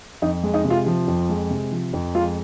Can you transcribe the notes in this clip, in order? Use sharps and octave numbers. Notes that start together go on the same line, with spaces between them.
F2 D#4
G#3
D#4
C3
F4
F3
F2
G#3
C3
F3
F2
G#3 F4